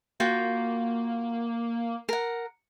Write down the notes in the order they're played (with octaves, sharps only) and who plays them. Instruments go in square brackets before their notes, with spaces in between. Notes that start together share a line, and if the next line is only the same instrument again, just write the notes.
[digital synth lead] A#3 [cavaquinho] F4 F#4 G5
[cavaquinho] A#4 F#5